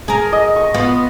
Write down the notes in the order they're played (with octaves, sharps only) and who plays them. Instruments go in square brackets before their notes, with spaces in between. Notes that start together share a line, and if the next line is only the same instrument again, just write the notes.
[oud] G#4 A#4
[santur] D#5
C#6
[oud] B3 F4